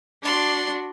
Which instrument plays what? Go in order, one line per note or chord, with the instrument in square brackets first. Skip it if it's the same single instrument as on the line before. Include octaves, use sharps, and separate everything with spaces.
[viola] D4 F#4 [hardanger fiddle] D5 C6